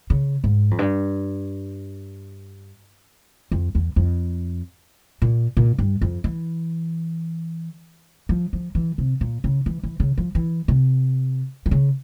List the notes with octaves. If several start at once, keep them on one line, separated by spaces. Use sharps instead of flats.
C#3
G#2
F2
G2
F2
E2
F2
A#2
A#2
G2
F2
E3
F3
F3
E3
C3
A#2
C#3
E3
E3
C#3
F3
E3
C3
E3
C#3